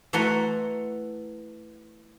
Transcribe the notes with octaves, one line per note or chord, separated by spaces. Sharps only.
E3 A3 F#4 F#5 A#5 C6